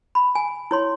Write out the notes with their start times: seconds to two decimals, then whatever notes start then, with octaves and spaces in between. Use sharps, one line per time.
0.15 B5
0.35 G#5
0.71 E4 C#5 C6